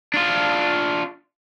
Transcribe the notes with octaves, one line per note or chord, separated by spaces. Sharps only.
D4 F4